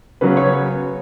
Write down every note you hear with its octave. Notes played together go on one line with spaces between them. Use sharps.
C#3 F#3 B3 B4
C#5